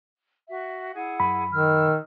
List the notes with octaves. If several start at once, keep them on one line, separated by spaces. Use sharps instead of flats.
F#4 E5
E4 G#4 F#5
F#2 B5
D#3 E6 F6